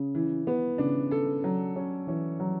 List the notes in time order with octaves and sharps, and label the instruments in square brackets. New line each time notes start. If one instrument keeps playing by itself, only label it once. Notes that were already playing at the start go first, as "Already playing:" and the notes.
Already playing: [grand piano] C#3
[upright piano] E3
B3
[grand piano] C#3 [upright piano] D4
[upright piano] A4
F#3
C#4
[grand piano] E3 [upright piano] C#4
[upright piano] F#3